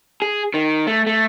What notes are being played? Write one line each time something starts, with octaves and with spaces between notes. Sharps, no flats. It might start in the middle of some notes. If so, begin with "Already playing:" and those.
G#4
D#3
A3
A3